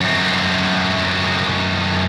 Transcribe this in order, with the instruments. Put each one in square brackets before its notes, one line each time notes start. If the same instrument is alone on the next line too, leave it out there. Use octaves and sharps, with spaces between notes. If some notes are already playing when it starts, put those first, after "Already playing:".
[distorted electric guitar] F#2 C4